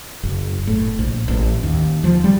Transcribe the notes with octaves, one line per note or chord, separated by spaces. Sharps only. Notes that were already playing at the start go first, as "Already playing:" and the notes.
F#1
A2
A#1
A1
D#2
F3
G3